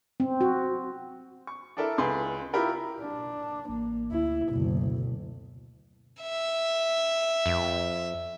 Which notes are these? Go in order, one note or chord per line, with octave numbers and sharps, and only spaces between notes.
C4
F#4
C#6
D4 E4 A4 A#4 D5 E5
C#2 G#4 B4 C6
E4 F4 G4 A#4 B5
D4
A1 A#3
D2 E4
F#1 D2 B2
E5
F2